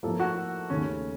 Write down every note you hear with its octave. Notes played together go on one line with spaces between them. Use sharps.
A2 F3 A#3 A4
F#4
D#2 C#3 A3 C#4